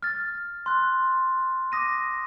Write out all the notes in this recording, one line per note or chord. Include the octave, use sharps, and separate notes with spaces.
F6 A6
C6 F#6
D6 D#6 A#6 D#7